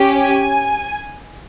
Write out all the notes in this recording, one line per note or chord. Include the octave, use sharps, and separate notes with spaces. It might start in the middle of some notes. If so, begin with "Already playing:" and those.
Already playing: C#4 G4
G#5